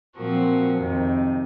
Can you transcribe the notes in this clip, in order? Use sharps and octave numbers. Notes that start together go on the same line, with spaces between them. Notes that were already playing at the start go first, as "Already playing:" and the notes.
A#2 F3 C4 F#4 A#4
F2 C3 D#3